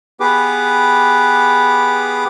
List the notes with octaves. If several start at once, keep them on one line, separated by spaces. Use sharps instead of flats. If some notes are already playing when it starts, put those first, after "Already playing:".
B3 G4 G#4 B4 D6